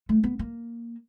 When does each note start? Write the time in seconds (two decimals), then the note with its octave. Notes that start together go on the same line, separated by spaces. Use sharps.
0.09 A3
0.24 B3
0.39 A#3